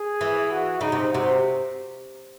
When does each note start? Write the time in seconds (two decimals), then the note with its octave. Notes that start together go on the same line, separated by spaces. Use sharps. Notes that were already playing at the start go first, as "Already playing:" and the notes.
Already playing: G#4
0.21 E3
0.51 F#4
0.81 C#3 D#4
0.92 C3
1.12 C3 F#4